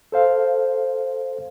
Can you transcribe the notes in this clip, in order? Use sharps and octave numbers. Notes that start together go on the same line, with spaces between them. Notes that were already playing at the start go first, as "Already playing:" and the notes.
A4 C5 F5